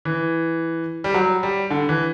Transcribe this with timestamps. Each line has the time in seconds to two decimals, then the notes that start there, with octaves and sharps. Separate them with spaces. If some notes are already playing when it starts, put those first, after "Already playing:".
0.05 E3
1.04 G3
1.14 F#3
1.43 G3
1.70 D3
1.89 E3